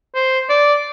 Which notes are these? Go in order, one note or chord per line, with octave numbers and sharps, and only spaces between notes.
C5
D5